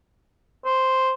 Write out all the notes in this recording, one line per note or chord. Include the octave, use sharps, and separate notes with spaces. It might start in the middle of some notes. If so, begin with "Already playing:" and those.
C5